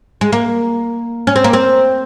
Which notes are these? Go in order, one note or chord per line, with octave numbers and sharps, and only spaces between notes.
G#3
A#3
C#4
C4
A#3
C4